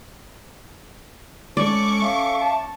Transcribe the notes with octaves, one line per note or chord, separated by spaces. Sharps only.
G#3 C#4 A4 D5 C#6 D6
E5 F5
A5